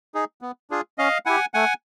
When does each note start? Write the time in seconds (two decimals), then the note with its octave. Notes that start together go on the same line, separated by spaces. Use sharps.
0.14 D#4 G#4
0.41 B3
0.70 D4 F4 G#4
0.98 C#4 D#5 F5
1.26 E4 G4 F#5 G#5
1.54 A3 F#5 G#5